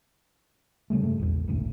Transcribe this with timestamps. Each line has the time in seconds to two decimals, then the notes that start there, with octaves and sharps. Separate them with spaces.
0.90 C#3 F#3 G3 A3
1.02 G2 A3
1.20 A#1 E2
1.48 G1 C#2 A2